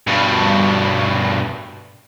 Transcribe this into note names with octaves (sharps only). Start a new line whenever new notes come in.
G2 B2